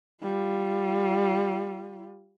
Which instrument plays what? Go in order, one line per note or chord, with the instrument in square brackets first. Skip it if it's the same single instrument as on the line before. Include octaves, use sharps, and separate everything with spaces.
[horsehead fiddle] G3 F4